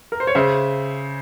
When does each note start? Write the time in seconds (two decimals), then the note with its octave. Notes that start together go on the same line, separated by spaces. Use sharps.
0.12 A#4
0.20 C5
0.27 C#5
0.35 C#3 C5 E5